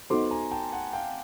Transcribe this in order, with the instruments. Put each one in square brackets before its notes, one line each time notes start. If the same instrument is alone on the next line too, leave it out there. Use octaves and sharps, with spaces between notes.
[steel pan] B3 D#4 F#4 A4 C5 [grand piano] C6 D6
[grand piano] G#5 A#5
G5 A5
F#5 G#5
F5 G5